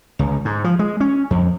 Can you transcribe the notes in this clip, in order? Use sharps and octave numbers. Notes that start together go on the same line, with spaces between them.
C#2
G#2
F3
G#3
C#4
F2